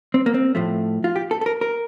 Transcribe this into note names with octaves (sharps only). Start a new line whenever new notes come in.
C4
A#3
C4
A2 F3 A3
F4
G4
A4
A4
A#4
A#4